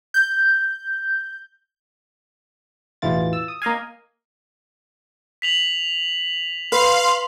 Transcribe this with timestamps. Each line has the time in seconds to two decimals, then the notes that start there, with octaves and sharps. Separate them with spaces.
0.14 G6
3.02 A1 E2 B2 E3 F4 A6
3.33 E6
3.48 D#6
3.62 A#3 D#5 F5 G#5
5.42 B6 F7 F#7
6.72 B4 F5 C6